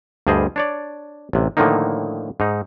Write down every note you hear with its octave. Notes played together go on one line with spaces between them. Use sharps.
D2 G2 G3 G#4 C5 D#5
D4 C#5 D5
A1 C3
A2 D3 D#3 F3 A#3 D#4
G#2 D#4